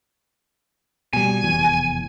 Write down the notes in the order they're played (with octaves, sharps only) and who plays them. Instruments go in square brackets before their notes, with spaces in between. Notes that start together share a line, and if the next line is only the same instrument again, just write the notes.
[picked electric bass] B2 G3 [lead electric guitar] G#5
[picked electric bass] F1 E2